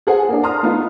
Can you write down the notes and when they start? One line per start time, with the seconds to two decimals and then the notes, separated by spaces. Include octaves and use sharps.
0.07 G#4 A4 C5 F#5 G#5
0.29 A#3 D4
0.43 A5 A#5 C6 D#6 F6
0.63 A3 B3 D#4 F4 F5